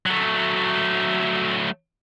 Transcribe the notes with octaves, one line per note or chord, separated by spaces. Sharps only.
F#3 A3